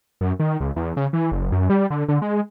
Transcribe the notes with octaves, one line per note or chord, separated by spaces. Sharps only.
F#2
D#3
C#2
E2
C#3
E3
F#1
F#2
G3
D3
D3
G#3